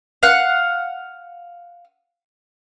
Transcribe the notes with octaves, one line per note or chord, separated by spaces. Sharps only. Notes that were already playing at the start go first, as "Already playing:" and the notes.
F5 F#5